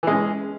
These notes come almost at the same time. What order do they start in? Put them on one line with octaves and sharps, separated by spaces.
E3 G#3 C#4